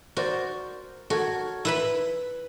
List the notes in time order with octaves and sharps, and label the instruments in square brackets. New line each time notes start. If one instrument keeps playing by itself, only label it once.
[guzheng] F#4 [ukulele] A#4 C5 D5
[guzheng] F#4 [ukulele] A4 A#4 C#5
[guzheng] E4 B4 B5